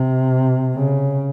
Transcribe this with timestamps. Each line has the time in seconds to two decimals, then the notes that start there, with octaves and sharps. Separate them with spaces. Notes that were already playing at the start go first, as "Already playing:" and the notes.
Already playing: C3
0.75 C#3